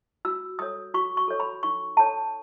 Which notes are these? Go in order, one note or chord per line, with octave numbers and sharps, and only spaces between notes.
F#4 E6
A4 C#5 D#6
F#4 C#6
C#6
A4 C#5
B5
D#4 C#6
A4 C#5 A5